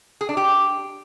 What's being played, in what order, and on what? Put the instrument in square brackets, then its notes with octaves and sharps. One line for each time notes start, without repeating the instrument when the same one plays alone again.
[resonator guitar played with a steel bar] G#4
D4
G4